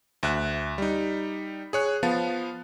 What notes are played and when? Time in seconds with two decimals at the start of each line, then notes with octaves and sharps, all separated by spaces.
0.23 D2 E5 F#6
0.78 G3 D#4
1.73 G#4 C#5 F#6
2.03 F3 B3 F5 A5 A6